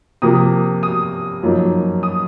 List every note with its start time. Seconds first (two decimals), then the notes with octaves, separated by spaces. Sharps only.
0.22 C3 F3 A#3 D#6
0.83 D#6
1.43 F#2 F3 A#3 D#4
2.03 D#6